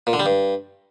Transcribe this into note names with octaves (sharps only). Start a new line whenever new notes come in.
A#2
D3
G3
G2